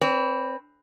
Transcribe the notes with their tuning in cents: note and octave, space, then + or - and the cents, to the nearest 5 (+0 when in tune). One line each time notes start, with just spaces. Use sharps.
C4 +10 B4 +0 D5 -45